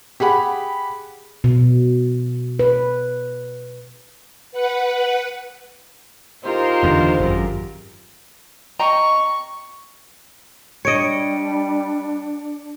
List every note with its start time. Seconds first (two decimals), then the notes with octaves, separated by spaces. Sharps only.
0.20 G4 G#4 F#5 B5
1.44 B2
2.59 B4
4.51 B4 F#5
6.44 D#4 F4 G4 A#4 C5
6.83 F#1 E2 D3
7.19 G#1 F#2
8.79 D#5 G5 A#5 C#6
10.85 G3 D4 C#5 D#5 C#7 D7